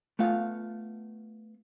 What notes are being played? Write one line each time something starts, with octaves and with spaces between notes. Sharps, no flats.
A3 B3 F4 F5